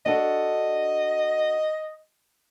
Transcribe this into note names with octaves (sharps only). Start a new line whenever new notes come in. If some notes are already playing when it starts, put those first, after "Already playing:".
D4 F#4 A4 D#5